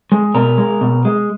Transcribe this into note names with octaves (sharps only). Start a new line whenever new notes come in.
G#3
B2 A#4
G#3
B2
G#3